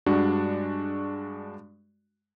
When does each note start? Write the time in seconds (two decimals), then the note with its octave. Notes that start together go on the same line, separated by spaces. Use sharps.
0.06 G2 G#3 D4 F#4